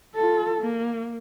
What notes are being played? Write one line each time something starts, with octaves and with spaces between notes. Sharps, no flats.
F4 A4
A#3